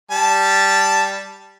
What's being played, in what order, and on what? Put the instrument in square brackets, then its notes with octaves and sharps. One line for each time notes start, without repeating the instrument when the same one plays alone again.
[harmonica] G3 A5